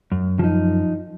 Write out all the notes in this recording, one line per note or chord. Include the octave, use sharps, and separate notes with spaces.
F#2
F3 D#4